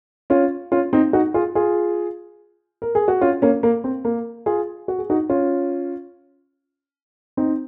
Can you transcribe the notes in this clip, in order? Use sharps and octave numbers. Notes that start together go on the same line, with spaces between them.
C#4 F4
C#4 F4
C4 D#4
D#4 F#4
F4 G#4
F4 G#4
A#4
G#4
F#4
C#4 F4
A#3 C#4
A#3
C4
A#3
F4 G#4
F#4
G#4
D#4 F#4
C#4 F4
C4 D#4